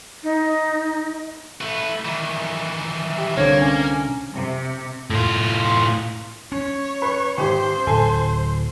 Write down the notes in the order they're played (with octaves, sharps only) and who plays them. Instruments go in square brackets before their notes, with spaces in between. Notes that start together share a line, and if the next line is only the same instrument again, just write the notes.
[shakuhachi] D#4
[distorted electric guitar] A3 B4
D#3 E3
[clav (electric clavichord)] G4
[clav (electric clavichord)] C2 D3 C4 [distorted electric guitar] A#3 [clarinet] C#5
[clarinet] C#4
[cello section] C3
[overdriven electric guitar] A2 F4
[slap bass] C#4 [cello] C#5
[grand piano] B4 B5
[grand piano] G#1 G4 [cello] C5
[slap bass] D1 [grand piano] A4 G#5